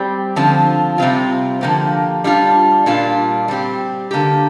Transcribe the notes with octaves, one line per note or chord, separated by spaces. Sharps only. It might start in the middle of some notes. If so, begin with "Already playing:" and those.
Already playing: G3 C4 G4
D3 F3 C4 F4
C3 G3 C4 F4
D3 F3 A#3 G4
G3 D4 F4
A#2 G3 A#3 D4 F4
G3 C4 G4
D3 A#3 G4